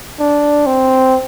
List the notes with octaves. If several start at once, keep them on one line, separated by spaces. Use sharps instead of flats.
D4
C4